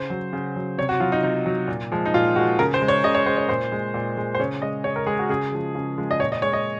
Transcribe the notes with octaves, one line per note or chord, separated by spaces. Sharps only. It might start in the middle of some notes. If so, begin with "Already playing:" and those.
Already playing: C#3 C5
F#3
C#3
F#3
C3 C#5
F#4
F#3 F4
D#4
C3 D#4
F#3
A#2
F3 G#3
D#4
A#2 F4
F3 G#3 F#4
C#3 A#4
C5
G#3
C#5
C#3 D#5
C#5
G#3 C5
C#5
A#2 C5
G#3
A#2
G#3
C5
C#3 C#5
G#3 D#5
C#3 C#5
A#4
G#3 G#4
F#4
C#3 G#4
F3 G#3
C#3
F3 G#3
D#5
A#2 C#5
D#5
G#3 C#5
D#5